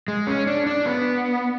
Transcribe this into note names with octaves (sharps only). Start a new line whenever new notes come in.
G#3
C#4
D4
D4
B3